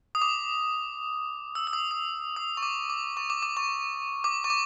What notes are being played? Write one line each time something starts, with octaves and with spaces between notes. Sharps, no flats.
D#6
D6
E6
E6
D#6
D#6
D#6
C#6
D6
D6
C#6
D6
D6
C#6
D6
C#6
D6